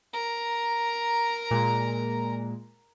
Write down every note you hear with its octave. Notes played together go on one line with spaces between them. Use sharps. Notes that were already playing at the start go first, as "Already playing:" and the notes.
A#4 A#5
A#2 G#3